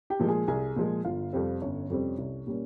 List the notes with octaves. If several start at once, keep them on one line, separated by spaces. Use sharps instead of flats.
G4 G5
A#2 F3 G#3
G#4 G#5
C2 G#4 G#5
A#2 F3 G#3
G1 F4 F5
F2 C3 G3 C4
G1 C#4 C#5
F2 C3 G3 C4
C2
A#2 G3 A#3 C#4